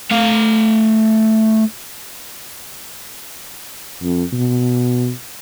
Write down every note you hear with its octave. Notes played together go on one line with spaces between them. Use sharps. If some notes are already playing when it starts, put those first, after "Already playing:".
A3 F5
F2
B2